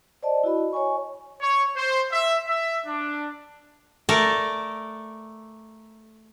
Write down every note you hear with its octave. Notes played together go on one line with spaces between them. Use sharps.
C5 D5 D#5 A5
E4 F#4 D#5 B5
C#5 D#5 G#5 C#6
C#5
C5
E5
E5
D4
A3 A4 A#4 D5